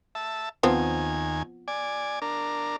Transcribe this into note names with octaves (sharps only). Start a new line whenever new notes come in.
E5 A5
D#2 F3 B3 C4 G#5
D5 G#5
D4 A#4